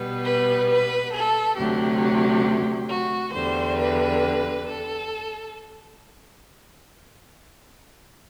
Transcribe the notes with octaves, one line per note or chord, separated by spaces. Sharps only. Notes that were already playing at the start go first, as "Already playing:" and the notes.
Already playing: B2 G3 B3
B4
B4
A4
D2 C3 F#3 G4
F#4
E2 D3 G3 C5
B4
A4